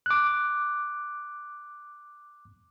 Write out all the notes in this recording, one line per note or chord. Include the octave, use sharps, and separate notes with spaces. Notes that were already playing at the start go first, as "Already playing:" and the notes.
D6 F#6